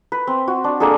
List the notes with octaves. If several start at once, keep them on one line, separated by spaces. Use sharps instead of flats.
B4
C4
F#4
D4
A#3 D4 G#4 A4